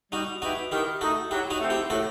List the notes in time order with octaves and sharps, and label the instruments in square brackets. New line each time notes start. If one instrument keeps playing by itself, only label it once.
[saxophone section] G3 [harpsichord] D#4 F#4
[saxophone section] B3 E4 G4 [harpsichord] D#4 F#4
[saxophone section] D#3 [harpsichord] E4 G4
[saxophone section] A3 D#4 [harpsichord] F#4 A4
[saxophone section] F#3 [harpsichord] E4 G4
[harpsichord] D#4 F#4
[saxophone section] A3 C4
[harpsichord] E4 G4
[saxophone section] A2 [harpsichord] F#4 A4